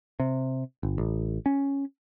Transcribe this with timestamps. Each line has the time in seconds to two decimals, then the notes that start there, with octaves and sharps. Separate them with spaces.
0.20 C3
0.83 G1
0.98 A1
1.46 C#4